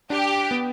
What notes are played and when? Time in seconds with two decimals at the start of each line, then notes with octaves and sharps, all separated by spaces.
0.10 D4 G4
0.51 B3